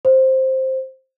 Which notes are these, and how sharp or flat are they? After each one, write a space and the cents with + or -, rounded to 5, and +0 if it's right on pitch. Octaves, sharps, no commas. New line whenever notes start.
C5 +5